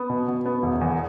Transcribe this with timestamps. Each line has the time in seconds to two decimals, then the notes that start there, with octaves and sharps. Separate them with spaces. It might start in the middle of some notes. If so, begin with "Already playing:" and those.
Already playing: B3
0.10 B2
0.28 B2
0.46 B3
0.63 E1
0.81 E2